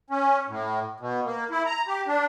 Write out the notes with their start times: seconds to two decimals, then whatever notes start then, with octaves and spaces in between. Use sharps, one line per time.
0.10 C#4
0.49 A2
1.00 B2
1.25 A#3
1.51 E4
1.66 A#5
1.87 G4
2.08 D4